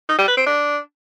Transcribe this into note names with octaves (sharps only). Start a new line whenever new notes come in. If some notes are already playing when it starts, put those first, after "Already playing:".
D#4
G3
B4
C4
D4